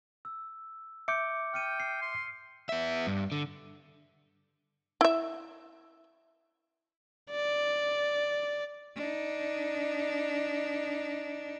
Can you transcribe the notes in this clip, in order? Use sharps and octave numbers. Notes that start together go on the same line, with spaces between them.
E6
E5 D6 G6 C#7
G5 F6 C#7 D#7
C7
C6
B3 E5
G2
D3
E4 E5
D5
D4 D#4